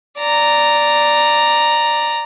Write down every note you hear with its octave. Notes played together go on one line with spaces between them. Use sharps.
D5 A#5